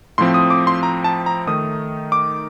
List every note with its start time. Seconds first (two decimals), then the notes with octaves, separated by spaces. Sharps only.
0.18 A2 F3 C4 C6
0.34 D#6
0.50 D6
0.67 C6
0.83 A#5
1.04 A5
1.26 A#5
1.47 D#3 A3 D#4 D#6
2.12 D6